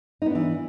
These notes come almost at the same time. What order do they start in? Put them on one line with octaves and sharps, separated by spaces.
D#4 B3 D4 E3